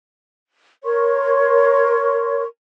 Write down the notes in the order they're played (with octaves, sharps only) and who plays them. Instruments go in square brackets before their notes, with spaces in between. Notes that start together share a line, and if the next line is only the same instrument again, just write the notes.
[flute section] A#4 C#5 C6 C#6